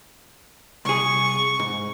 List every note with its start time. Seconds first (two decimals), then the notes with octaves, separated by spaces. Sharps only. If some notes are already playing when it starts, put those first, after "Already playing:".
0.85 C2 G#4 C#6
1.59 G#2